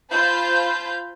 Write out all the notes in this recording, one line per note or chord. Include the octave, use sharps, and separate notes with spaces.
F4 C5 F5 A5 B5 G6